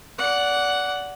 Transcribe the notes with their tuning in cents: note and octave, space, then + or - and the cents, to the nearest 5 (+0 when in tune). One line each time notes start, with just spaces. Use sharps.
D5 -20 F#5 +0